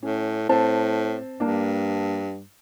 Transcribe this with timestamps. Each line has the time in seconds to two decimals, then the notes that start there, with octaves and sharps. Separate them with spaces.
0.03 A2 C#4
0.49 A2 C4 C5 A5
1.40 G2 A#3 D4